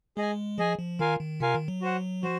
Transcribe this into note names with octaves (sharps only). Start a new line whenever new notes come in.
G#3 G#4 D#5 G#5
F3 G#4 D#5 G#5
F3
D#3 F4 A#4 F5 G#5
D#3
C3 F4 A#4 F5 G#5
D#3
F#3
F#4 C5 F#5
F3 F#4 C5